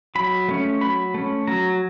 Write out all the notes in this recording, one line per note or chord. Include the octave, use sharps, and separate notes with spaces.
F#3 B5
A3 C#4
F#3 B5
A3 C#4
F#3 A#5